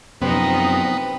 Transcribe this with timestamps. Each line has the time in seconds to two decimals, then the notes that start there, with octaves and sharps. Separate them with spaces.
0.22 F#2 C3 F3 B3 C4 D#4